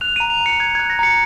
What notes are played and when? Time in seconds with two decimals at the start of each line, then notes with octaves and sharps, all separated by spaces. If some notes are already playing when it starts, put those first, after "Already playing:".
0.01 F#6 F7
0.16 A#5 D#7
0.30 F7
0.41 A#5
0.46 C#7
0.60 F#6 G#6
0.75 F#6 G#6
0.90 A#6
0.99 A#5 C#7